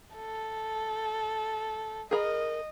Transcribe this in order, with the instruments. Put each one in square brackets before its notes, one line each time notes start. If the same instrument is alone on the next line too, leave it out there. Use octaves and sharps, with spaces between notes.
[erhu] A4
[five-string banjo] G#4 A#4 B5 [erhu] D#5